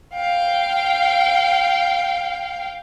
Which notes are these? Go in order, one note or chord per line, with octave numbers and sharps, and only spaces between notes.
F5 G5